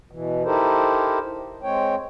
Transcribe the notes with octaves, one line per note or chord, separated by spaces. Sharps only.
B2 E3
D#4 E4 G4 A4 A#4 C5
G#3 C4 C#5 G5